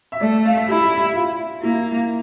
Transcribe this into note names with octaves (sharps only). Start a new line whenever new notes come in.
E5
A3 D5
F5
E5
E4 G4
F4
A#3 E4